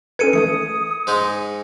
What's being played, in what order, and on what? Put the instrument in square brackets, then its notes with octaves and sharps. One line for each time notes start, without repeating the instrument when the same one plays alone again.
[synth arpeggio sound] C#4 A4 B4 [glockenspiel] G#6 C#7 D#7
[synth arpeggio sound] E3 A3 A4 [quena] D#6 [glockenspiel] C#7
[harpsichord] G#2 G#3 D#4